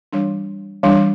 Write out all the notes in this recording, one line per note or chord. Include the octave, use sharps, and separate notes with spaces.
E3 G3 D4
E3 G3 D4